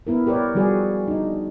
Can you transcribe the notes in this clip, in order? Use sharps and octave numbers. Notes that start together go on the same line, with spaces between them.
B3 E4 A#4
G4 A#4 B4 C#5 D5
F3 G3 F#4 G#4 D5
D4 D#4